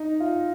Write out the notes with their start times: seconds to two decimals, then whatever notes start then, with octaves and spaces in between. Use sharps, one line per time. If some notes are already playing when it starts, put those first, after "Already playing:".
Already playing: D#4
0.20 F4